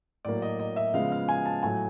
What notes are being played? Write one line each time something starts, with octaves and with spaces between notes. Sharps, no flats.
A2 F#3 A#3 D5
D#5
D#5
E5
C#3 F3 G#3 B3 F5
F5
G#5
A5
A2 F#3 A3 G#5